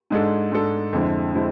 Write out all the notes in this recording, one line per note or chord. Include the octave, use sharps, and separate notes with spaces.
G#2 G#3 D4 A4
G#2 G#3 D4 A4
F2 D3 G#3 C4 E4
D3 G#3 C4 E4